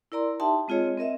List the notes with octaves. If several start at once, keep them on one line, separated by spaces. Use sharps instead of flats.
E4 A#4 D5 A#5 C6
D#4 G4 E5 G5 A5 C6
G#3 C4 F4 G#4 C#5 D#5
C4 A#4 D#5 E5